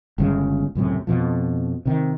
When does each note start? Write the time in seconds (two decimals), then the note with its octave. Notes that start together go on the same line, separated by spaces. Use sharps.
0.18 G1 G2 C#3 G#3
0.75 C#2 F#2 A2 C3
1.07 F2 B2 F3
1.85 C3 D#3